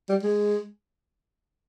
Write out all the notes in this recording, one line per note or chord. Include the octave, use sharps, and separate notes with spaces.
G3
G#3